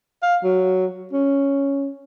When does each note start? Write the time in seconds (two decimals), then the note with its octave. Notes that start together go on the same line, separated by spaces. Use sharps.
0.23 F5
0.44 F#3
1.13 C#4